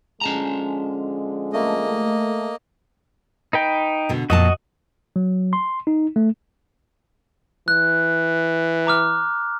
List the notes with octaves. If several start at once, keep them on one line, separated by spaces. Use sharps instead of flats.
D3 F3 G#3 C#4 A5 A#5
A3 A#3 D#5
D#4 B4 G5
B2 D3
F2 A#2 F#4 D#5 A5
F#3
C6
D#4
A3
E3 F#6
A#5 D6 F6